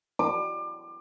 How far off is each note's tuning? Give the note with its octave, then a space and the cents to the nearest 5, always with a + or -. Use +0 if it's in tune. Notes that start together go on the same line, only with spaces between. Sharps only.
D6 +30